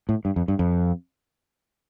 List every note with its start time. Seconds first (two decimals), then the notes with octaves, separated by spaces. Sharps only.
0.09 A2
0.25 G2
0.36 F2
0.48 G2
0.59 F2